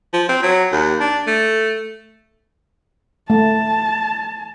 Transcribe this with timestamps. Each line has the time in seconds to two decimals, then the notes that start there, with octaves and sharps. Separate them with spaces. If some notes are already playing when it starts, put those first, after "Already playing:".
0.13 F3
0.29 C4
0.43 F#3
0.72 D#2
1.00 D4
1.26 A3
3.30 A3 A5